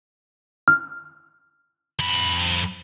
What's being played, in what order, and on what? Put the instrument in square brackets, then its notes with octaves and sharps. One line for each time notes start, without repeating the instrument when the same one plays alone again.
[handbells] F6
[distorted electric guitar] F2 B5